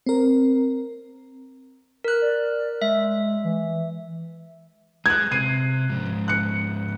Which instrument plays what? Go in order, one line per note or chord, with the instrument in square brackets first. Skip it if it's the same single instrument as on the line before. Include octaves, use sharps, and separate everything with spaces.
[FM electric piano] C4 A#4
[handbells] A#4 F#6
[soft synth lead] D5
[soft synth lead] G#3 [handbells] E5
[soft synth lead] E3
[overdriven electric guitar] G#3 [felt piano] F#6 G#6
[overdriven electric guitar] C3 [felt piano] C7 D#7
[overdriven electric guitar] G#2 F3
[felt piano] F#6 C#7